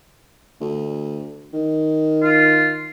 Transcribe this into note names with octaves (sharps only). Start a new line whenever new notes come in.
D2
D#3
F4